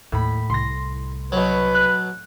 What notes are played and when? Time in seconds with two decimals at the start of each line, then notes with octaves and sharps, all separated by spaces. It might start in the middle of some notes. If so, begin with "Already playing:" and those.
0.12 D#2 A2 B5
0.50 C2 C6 A#6
1.32 B2 F#3 B4
1.75 F#6